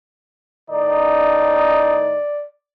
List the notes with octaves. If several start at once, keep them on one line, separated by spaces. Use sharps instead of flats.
A2 D#3 D#4 D5